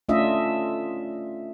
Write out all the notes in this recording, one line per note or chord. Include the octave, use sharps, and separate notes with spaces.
A3 C#4 D4 F4 D#5 E5